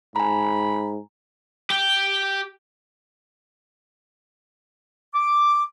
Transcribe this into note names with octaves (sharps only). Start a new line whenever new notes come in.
G#2 G#5 A#5 B5
G4 G5
D6